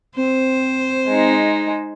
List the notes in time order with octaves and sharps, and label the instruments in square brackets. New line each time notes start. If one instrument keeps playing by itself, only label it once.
[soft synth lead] C4 [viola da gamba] C5
[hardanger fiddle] G#3 D#4